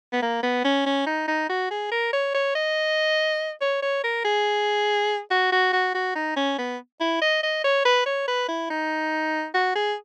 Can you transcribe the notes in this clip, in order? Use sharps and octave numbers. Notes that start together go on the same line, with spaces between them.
B3
A#3
B3
C#4
C#4
D#4
D#4
F#4
G#4
A#4
C#5
C#5
D#5
C#5
C#5
A#4
G#4
F#4
F#4
F#4
F#4
D#4
C#4
B3
E4
D#5
D#5
C#5
B4
C#5
B4
E4
D#4
F#4
G#4